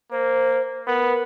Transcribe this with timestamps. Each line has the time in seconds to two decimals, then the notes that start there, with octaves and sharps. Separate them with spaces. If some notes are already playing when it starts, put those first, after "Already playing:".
0.12 A#3 C5
0.87 B3 A#4